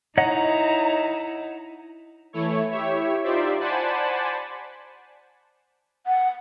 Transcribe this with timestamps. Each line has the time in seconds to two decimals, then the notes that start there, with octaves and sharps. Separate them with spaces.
0.18 D#4 E4 C#5 D#5 F#5 A#5
2.33 E3 A3 E4 C#5
2.70 E4 G4 C#5 E5
3.23 D#4 F4 G4 C5 D5 E5
3.60 C5 D5 F#5 G#5 A5 B5
6.07 F#5